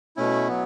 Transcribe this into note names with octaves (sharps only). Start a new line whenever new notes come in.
B2 A3 C#4 E4
F#3 B3